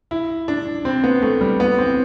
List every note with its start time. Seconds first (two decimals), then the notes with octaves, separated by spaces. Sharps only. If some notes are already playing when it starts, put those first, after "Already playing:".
0.11 E4
0.48 D4
0.85 C4
1.04 B3
1.22 A3
1.41 G3
1.60 B3
1.78 C4